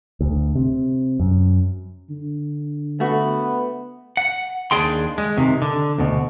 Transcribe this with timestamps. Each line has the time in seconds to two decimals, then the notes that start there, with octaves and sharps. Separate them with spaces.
0.21 D2
0.55 C3
1.20 F#2
2.10 D3
3.00 A3 B3 F#4
4.17 F#5
4.71 D#2 D4 G#4 G5 C6
5.18 G#3
5.38 C3 D#3
5.62 D3
5.98 D2 B2